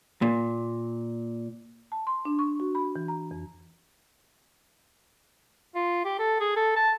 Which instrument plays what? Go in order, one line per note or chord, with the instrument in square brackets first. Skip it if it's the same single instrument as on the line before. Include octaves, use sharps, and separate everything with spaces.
[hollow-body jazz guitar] A#2
[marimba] A5
C6
D4
C#6
F#4
B5
E3
A#5
F2
[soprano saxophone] F4
G4
A4
G#4
A4
A5